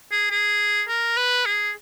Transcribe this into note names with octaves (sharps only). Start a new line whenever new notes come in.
G#4
G#4
A#4
B4
G#4